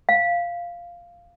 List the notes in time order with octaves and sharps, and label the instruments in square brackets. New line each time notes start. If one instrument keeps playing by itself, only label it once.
[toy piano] F5